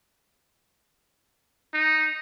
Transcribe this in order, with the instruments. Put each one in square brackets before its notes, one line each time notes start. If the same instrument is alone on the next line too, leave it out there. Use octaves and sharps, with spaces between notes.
[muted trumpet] D#4